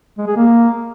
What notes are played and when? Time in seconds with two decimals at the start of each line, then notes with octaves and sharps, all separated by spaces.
0.18 G#3
0.27 G#4
0.36 A#3